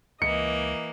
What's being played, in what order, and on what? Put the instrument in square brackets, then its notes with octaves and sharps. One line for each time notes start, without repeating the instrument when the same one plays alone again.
[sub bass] C#2 [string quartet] E3 A#3 [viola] D#5 [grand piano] C#7